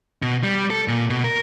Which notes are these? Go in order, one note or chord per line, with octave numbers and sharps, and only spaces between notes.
B2
G3
A4
A#2
B2
A#4